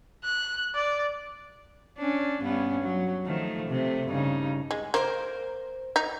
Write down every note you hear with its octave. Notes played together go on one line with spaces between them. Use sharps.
F#6
D5
C#4 D4
G2 B3 C#4
F#3
D#3 F3 A3
C3 A3
G2 C#3 D#4
G#3
A#3 A#4 C5
D#4